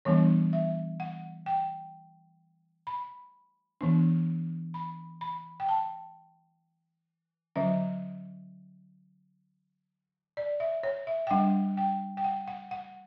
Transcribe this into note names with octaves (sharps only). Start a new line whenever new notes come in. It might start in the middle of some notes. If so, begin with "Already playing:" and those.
E3 G3 B3 D4 C#5
E5
F#5
G5
B5
E3 B3 D4
B5
B5
G5
A5
D3 F#3 C#4 E5
D5
E5
C#5
E5
G5
G3 D4 F#5
G5
G5
F#5
F#5
F#5